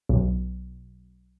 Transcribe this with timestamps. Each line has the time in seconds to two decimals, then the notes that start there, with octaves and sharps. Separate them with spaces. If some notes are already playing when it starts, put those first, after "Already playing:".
0.09 B1